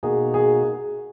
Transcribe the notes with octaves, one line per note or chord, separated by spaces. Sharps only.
B2 A#3 D#4 F#4 G#4
G#4